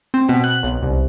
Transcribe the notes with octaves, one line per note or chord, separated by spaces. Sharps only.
C4
B2
F#6
B1
C2